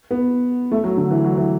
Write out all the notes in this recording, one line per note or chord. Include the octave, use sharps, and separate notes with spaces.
B3
A3
F#3
D3
E3
F#3
E3